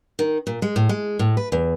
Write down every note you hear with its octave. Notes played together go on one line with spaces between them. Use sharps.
D#3
A#2
G#3
A2
G#3
A2
B4
E2